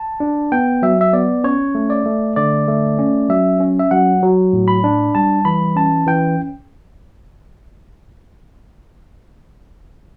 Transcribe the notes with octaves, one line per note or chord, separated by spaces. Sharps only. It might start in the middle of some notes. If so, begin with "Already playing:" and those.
Already playing: A5
D4
B3 G5
F#3 E5
E5
B3 D5
C#4 C#5
A3
D5
A3
D3 D5
A3
C#4
F#3 E5
C#4
E5
F#3 F#5
F#3
A2
B5
D4
G3 A5
E3 B5
C#4 A5
E3 G5